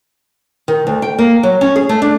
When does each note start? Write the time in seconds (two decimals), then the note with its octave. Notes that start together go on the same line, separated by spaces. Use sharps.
0.68 D#3
0.87 D2
1.02 G5
1.18 A#3
1.43 F#3
1.61 C#4
1.76 G#4
1.89 A3
2.02 D4